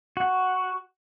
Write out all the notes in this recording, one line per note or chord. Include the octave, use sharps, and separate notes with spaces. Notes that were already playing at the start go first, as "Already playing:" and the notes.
F#4